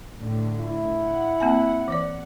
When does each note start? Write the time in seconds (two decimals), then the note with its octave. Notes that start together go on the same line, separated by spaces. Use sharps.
0.18 A2 D3
0.60 E4
1.01 F#5
1.40 A#3 C4 G#5
1.88 E3 C5 D5